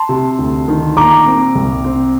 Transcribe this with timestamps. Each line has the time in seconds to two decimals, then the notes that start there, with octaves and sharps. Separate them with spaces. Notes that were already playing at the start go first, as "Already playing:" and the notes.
Already playing: A5 C6
0.09 C3
0.39 D2
0.68 D#3
0.97 A#2 A#5 D6
1.26 C4
1.55 C2
1.84 C4